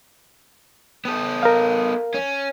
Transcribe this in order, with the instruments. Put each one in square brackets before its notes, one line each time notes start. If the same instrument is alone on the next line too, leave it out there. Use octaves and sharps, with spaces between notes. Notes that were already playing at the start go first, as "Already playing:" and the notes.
[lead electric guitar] B3 A4
[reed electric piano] A#4 F5
[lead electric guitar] C#4